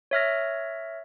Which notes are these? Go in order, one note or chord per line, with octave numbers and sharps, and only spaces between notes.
C#5 E5 F6 A#6